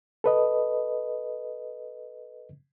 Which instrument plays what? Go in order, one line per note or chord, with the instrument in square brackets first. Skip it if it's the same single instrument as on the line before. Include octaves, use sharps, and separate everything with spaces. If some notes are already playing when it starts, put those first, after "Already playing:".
[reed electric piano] A4 B4 D#5